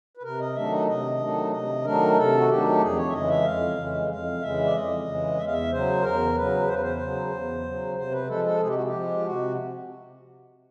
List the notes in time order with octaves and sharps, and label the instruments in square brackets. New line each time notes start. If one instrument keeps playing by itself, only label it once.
[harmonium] B4
C3 A#4
D#5
D#3 F#3 A3 D4 E5
D#5
C3 D#5
D#3 F#3 A3 D4
C3 D#5
D#3 F#3 A3 D4 A#4
C3 A4
F#4
D#3 F#3 A3 D4 G4
F2 G#4
C#5
E5
C#3 E3 G#3 D#5
E5
F2 F5
C#3 E3 G#3
F2 F5
C#3 E3 G#3 E5
D5
F2 D#5
C#3 E3 G#3
E2 E5
F5
E5
C#3 F#3 C5
E2 A#4
C#3 F#3 B4
E2 C5
B4
C5
C#3 F#3
E2
C#3 F#3
C3 C5
B4
F3 G#3 A4
A4
C3 G#4
G4
F#4
G4
F3 G#3
F4
C3 F#4